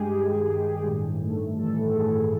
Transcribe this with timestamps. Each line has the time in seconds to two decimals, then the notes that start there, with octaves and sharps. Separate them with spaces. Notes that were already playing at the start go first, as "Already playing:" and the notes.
Already playing: G2 G#3 G4 G#4
0.15 D#3
0.51 G2
0.88 A2
1.23 A3
1.59 E3 A4
1.95 A2 G#4